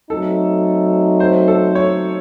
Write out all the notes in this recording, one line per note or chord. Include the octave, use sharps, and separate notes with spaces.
F#3 A3 C4 D#4 A4
C5
A4
C#5